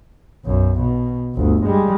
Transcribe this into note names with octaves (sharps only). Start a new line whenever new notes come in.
B1 F#2
B2
G1 D2
G3 G#3